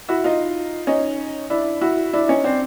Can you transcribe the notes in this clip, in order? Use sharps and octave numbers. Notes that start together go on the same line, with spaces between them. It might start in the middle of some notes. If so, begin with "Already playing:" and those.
E4 F#4
D#4 F4
C#4 D#4
D4 E4
E4 F#4
D4 E4
C#4 D#4
C4 D4